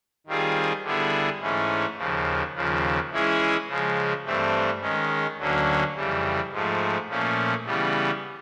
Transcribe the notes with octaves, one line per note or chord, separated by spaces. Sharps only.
D#3 G3 C4 F4 G#4
D3 G3 B3 E4 G#4
G#2 E3 A3 C#4
D#2 C#3 F3
D#2 C#3 F3
E3 G#3 C#4 E4 G#4
C#3 F3 G#3
G2 E3 A3 C4
D#3 G#3 C#4
D2 D3 F#3 A#3 C#4
F2 C#3 E3 G3
G#2 F3 A3
A#2 F3 A3 C#4
C#3 E3 G3 B3